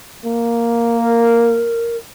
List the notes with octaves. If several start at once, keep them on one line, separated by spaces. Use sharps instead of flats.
A#3
A#4